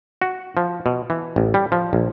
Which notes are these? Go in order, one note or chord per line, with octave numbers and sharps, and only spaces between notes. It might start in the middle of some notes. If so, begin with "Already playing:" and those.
F#4
F3
B2
E3
A1
G3
F3
A#1